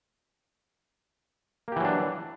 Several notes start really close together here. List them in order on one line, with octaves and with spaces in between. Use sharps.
A#3 G4 E3 F#3 D4